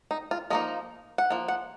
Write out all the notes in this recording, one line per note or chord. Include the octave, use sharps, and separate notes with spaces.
D#4
F4
F3 A#3 D#4 D#5
F#5
F3 A#3
F#5